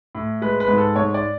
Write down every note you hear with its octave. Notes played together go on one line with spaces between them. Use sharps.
A2
G#3 B4
B4
G#2
A4
G#2 C#5
D5